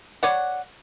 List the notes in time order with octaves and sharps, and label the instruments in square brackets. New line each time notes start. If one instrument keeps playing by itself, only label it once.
[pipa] C#5 D5 F#5